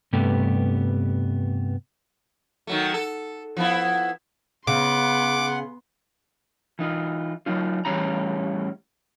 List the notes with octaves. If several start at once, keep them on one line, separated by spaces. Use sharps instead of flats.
G2 C3 G3 A3 B3 G4
D#3 F#3 A3
A4
F3 B3 E4
C#3 B3 F#5 C6 D6
E3 D#4 F4
F#3 D#4 F4
A2 E3 G3 C#4 E4 A#5